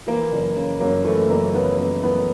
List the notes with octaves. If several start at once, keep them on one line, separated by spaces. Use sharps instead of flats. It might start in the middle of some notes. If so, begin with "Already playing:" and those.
E3 A#3
F#1
C#3
F#2 A#3
E3 A3
F#1 A#3
C#3 B3
F#2 A#3
E3 B3